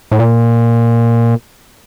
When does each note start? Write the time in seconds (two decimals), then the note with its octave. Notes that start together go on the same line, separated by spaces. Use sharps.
0.11 A2
0.19 A#2